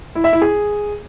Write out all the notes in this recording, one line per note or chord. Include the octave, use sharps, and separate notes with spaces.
E4
E5
E4
G#4